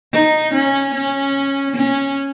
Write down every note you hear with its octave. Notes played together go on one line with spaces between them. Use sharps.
D#4
C#4
C#4
C#4